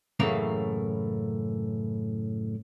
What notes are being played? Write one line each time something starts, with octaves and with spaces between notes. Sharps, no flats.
F#2 A2 C#3 E3 A#3